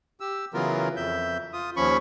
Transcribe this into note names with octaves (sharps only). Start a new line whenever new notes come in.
G4 E6
C#3 E3 F#3 B3 F4 A#4
F2 E5 G6
F4 D#6
D#2 F3 C#4 B5 C#6